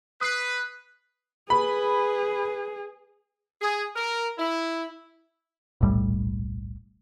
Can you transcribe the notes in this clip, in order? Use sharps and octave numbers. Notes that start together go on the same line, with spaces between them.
B4 D#6 C7
G#4 B4 B5
G#4
A#4
E4
D#1 B1 A2 G3